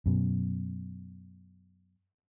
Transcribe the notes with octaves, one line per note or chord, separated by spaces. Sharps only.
F#2 B2